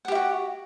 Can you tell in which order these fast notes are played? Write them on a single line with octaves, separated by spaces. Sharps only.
F#5 G4 E4 F#4